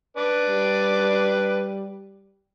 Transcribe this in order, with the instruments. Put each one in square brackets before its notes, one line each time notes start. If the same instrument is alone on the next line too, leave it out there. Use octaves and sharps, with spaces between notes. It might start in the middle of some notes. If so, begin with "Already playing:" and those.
[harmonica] D4 B4 D5
[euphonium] G3